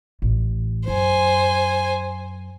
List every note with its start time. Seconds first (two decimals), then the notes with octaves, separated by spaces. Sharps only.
0.22 A1
0.88 F#2 C5 G#5